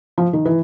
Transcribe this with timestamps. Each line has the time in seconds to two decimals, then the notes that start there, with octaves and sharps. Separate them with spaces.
0.18 F3
0.33 D#3
0.45 E3